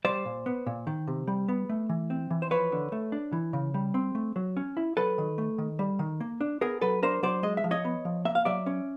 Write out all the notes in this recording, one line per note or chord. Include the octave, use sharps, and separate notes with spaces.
G3 C5 D5
A#2
B3
A#2
D#3
C3
G3
B3
A3
E3
C4
E3
C5
F3 B4 C#5
D3
A3
D4
E3
C#3
G3
C4
A3
F#3
C#4
E4
F#3 A4 B4
D#3
A3
D#3
G3
D#3
A#3
D4
B3 G#4 A#4
F#3 A4 B4
D4 A#4 C5
F#3 C5 D5
G#3 D#5
E5
F3
C#5 D#5
B3
F3
A#3 E5
F5
F#3 D5 E5
C#4